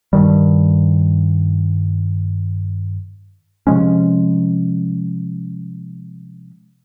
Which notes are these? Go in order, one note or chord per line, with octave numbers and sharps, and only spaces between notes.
G2 D#3 G3
C3 F3 G#3 C#4